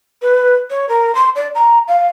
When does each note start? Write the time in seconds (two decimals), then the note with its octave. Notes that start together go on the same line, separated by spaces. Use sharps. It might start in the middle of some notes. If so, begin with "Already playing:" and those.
0.22 B4
0.70 C#5
0.89 A#4
1.15 C6
1.36 D5
1.55 A#5
1.88 F5